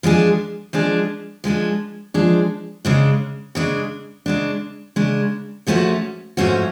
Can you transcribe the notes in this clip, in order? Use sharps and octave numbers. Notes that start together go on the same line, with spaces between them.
F3 G#3 D4 G#4
F3 G#3 D4 G#4
F3 G#3 D4 G#4
F3 G#3 D4 G#4
C#3 G#3 D4
C#3 G#3 D4
C#3 G#3 D4
C#3 G#3 D4
G#2 F3 A3 C#4 F#4
G#2 F3 A3 C#4 F#4